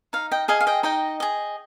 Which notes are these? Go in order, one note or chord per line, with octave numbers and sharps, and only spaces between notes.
D#4 F5
D#5 G5
G#4 D#5 F5 G#5
F5
D#5 G5
D#4 D#5 G5
G#4 D#5